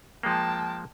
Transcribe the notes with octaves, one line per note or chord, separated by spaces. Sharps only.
F3 G#3 A#3 G5 A5